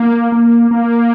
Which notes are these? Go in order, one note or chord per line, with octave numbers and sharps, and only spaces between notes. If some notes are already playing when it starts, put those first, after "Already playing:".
Already playing: A#3
A#3
A#3